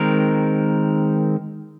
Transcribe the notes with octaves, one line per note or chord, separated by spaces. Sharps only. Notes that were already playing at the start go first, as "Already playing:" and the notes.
Already playing: D#3 G#3 C4 A#4